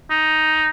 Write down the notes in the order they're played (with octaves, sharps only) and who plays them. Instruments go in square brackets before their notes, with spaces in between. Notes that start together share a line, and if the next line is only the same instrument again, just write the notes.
[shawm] D#4